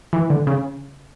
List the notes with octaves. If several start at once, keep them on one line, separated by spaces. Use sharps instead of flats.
E3
D3
C#3